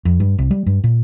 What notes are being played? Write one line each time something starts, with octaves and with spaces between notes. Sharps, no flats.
F2
G2
C2
G3
G2
A#2